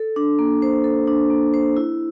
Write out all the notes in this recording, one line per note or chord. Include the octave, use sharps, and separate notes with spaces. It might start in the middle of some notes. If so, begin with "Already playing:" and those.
Already playing: A4
D4
A#3
C5
A4
D4
A#3
C5
E4